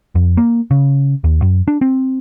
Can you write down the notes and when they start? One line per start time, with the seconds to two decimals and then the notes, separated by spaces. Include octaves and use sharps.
0.15 F2
0.37 A#3
0.71 C#3
1.24 D#2
1.42 F#2
1.68 D4
1.81 C4